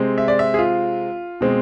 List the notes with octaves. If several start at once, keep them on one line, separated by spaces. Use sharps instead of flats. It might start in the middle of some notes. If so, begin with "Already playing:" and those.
Already playing: C3 G#3 C4
E5
D5
E5
G#4
F4
B2 G#3 C4